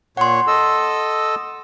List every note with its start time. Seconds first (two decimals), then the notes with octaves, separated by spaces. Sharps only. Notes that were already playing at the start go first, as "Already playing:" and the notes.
0.17 A#2 C#5 F#5 C6
0.47 A4 D#5 E6